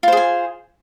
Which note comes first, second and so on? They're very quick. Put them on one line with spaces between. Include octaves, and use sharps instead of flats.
F4 C5 G#4 G#5